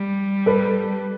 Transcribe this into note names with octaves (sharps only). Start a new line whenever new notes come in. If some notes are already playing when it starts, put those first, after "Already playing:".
Already playing: G3
A4 B4